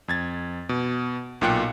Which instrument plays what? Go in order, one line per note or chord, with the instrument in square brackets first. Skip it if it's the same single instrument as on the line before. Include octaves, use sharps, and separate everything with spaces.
[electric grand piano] F2 G#6 A6
B2
B1 A#2 F4 G5 F#6 C#7